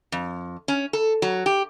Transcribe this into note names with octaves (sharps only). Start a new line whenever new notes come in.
F2
C#4
A4
F#3
G4